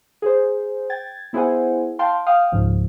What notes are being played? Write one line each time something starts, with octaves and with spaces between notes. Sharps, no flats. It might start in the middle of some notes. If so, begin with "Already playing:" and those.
G#4 C5
G5 G#6 A6
B3 E4 G#4 C5 F#5 G#5
F5 G5 A5 C6
F5 G5 D#6 F6
C#2 G#2 F3